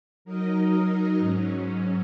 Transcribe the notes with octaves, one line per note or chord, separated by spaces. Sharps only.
F#3 D#4 A#4 D#5
G#2 F#3 C#4